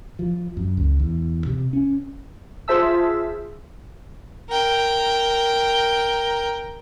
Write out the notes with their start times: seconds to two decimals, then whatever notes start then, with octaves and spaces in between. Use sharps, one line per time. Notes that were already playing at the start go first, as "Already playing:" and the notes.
0.19 F3
0.57 F#2
0.77 C#2
0.99 E2
1.46 C3
1.73 C#4
2.68 F4 G#4 C5 E5 A5 E6
4.49 A#4 G5